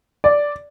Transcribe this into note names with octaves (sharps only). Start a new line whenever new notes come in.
D5